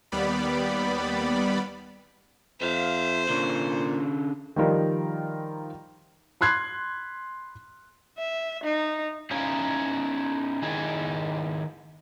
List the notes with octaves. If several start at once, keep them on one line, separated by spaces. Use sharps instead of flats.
D#2 G3 B3 D5 B5
F2 C5 E5 F5
A#2 D3 C#4
D#3 F3 G3 D#4 F4 A#4
B5 C6 F#6 G#6 C7
E5
D#4
C#4 D#4 E4 C#5 F5
D#3 E4 G#4